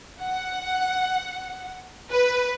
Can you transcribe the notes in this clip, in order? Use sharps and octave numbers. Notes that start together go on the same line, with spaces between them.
F#5
B4